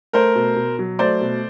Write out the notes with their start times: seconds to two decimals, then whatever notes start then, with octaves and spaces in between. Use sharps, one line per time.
0.13 A3 A#4 C5
0.35 B2
0.56 B2
0.79 F#3
0.99 A3 C5 D5
1.21 B2